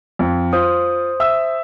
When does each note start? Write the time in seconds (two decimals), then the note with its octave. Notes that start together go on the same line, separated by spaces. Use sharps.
0.19 F2
0.53 F4 C5 D#6
1.20 E5 E6